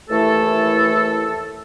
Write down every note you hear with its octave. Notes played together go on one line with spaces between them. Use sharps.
D#2 E3 A3 E4 A4